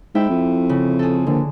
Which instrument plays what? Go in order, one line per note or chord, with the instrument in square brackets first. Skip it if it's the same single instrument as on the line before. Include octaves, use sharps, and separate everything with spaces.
[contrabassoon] G#2 [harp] E4 E5 G5
[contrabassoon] F2
[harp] C#3
G#4 A4
[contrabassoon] A#1 [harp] D3